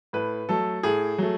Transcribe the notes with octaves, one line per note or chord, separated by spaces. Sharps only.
A2 B4
F#3 A3 A4
A2 G#4
F#3 A3